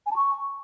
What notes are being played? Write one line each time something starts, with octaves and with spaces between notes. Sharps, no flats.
G#5
A5
C#6